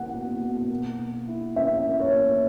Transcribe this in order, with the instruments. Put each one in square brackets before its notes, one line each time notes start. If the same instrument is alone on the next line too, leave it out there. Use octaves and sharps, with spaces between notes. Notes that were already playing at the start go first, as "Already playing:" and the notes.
Already playing: [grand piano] B2 A#3 E4 [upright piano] F#5
[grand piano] B2
B2
A#3
A#3
E4
[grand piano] C#4 [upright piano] E5
[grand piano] A#3
[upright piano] C#5
[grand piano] A#3